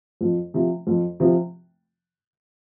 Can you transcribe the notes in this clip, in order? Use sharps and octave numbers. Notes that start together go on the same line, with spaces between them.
F2
C3 F3
F2
C3 F3